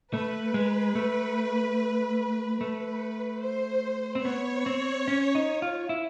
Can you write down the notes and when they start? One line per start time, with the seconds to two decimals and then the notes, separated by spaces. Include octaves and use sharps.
0.13 A3 B4
0.54 G#3
0.95 A3
2.60 A3 B4
3.42 C5
4.15 C4
4.24 B3 C#5
4.66 C4
5.08 C#4
5.35 D#4
5.62 F4
5.89 E4